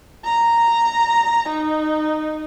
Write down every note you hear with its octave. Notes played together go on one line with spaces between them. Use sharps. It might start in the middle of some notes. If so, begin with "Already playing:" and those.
A#5
D#4